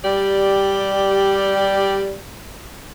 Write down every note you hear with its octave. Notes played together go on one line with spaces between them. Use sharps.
G3 G4 D5